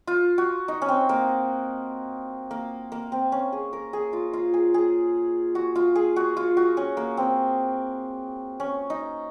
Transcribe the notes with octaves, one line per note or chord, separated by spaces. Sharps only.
F4
F#4
D#4
C#4
C4
A#3
A#3
A#3
C4
C#4
G#4
A#4
G#4
F4
F4
G#4
G#4
F#4
F4
G#4
F#4
F4
F#4
C#4
A#3
C4
C#4
D#4